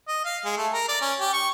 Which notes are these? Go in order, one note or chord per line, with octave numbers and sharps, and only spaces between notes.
D#5
F5
G#3
A3
A#4
D5
C#4
G4
C#6